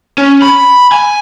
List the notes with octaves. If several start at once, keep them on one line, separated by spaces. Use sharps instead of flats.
C#4
B5
G#5